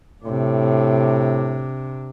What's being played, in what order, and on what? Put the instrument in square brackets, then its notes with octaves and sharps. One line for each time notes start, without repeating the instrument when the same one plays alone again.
[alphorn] A2 [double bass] C3 D4